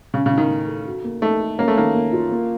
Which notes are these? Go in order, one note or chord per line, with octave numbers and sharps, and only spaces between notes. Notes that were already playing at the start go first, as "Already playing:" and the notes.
C#3 C#4
C#3
A2
D#3
A3
A4
F#4
A#3
A3 D#4
A4
A#3 C#4
A3
D#3 A#3
A#3
F4
A#3